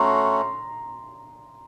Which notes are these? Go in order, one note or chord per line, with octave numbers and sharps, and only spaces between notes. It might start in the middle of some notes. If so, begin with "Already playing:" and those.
Already playing: A3 C#4 F#4 A#5 C6